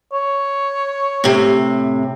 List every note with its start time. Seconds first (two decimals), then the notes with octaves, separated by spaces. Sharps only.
0.13 C#5
1.24 A2 C3